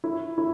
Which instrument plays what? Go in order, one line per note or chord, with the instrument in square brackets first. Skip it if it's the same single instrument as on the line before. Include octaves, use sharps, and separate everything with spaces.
[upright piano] E4
E4